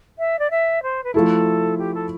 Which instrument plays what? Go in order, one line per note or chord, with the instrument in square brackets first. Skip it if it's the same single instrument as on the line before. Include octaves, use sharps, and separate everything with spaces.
[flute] E5
D5
E5
C5
B4
[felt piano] F3 A3 E4 [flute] A4
[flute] G4
A4